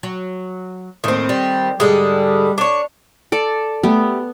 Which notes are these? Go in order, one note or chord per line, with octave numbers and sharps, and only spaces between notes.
F#3
D#2 A2 D#3 C4
G3
G#2 D3 G3 G#3 A4
D4 C#5
A4 D5
A3 B3 G4